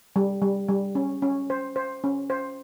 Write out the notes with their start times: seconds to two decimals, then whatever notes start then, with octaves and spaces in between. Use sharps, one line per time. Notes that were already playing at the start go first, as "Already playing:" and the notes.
0.16 G3
0.42 G3
0.68 G3
0.95 C#4
1.22 C#4
1.50 C5
1.76 C5
2.04 C#4
2.30 C5